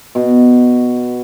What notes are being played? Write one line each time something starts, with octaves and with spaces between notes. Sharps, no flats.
B2